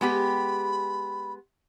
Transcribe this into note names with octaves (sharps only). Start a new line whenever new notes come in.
G#3 B3 G4 B5